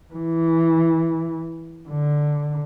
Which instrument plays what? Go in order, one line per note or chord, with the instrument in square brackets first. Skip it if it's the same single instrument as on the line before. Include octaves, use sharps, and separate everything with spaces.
[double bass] E3
D3